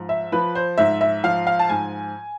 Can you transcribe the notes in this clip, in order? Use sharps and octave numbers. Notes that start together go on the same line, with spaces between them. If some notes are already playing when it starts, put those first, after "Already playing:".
Already playing: G#2 F3
E5
F3 B4
C5
G#2 E5
E5
F3 F5
F5
A5
G#2 G#5